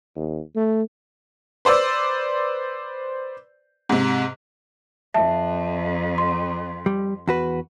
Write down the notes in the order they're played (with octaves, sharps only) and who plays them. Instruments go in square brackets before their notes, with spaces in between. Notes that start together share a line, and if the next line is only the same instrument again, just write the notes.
[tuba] D#2
A3
[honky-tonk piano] B4 C5 D5 E6
G#2 C3
[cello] F2 [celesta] E5 A5
[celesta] C6
[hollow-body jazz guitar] G3
E2 F#4 B4